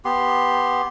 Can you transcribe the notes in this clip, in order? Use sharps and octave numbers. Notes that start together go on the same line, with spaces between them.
B3 G4 C6